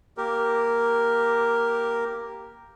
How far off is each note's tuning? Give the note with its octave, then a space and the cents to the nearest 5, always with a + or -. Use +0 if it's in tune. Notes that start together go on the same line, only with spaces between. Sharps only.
A#3 +0 G4 +0 A#4 +0